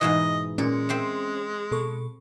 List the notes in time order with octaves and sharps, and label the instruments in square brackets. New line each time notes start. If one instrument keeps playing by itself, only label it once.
[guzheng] G#2 B2 E3 [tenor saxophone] D#5
[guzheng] A#2 [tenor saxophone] G#3 [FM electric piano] C#4
[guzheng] C4 C5 E5
[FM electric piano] B2 A4 C#6